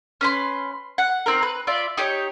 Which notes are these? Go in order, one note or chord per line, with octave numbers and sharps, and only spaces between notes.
C#4 B4 C6
F#5
C4 D#4 A#4
B4
F4 D5 E5
D#4 G4 C#5